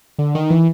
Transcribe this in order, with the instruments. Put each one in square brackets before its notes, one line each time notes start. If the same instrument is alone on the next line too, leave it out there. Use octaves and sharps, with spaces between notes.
[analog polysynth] D3
D#3
E3